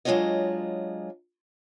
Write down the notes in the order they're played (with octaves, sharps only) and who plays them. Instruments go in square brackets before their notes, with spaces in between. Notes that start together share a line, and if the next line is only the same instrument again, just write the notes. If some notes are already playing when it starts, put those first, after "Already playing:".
[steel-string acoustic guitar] F#3 G#3 D4 F4 C#5 D#5